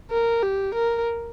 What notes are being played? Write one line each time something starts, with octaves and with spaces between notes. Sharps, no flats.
A#4
G4
A#4